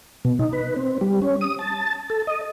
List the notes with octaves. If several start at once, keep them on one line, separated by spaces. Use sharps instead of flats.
B2
D#4
B4
C4
G3
C#4
D#6
A5
A4
D#5